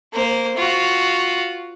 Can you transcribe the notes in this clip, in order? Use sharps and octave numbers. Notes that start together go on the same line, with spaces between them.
A#3 C5
F4 F#4